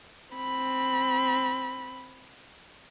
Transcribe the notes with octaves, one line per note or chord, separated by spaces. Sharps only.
C4 B5